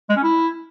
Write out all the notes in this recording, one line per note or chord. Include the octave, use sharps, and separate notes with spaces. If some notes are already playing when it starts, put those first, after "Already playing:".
G#3
C#4
E4